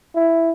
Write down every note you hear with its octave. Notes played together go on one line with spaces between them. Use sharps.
E4